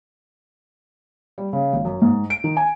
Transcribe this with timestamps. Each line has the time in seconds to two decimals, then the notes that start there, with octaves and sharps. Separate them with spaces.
1.38 G3
1.53 C#3
1.73 G#1
1.85 F#2
2.02 G#2
2.30 D7
2.44 D#3
2.57 G#5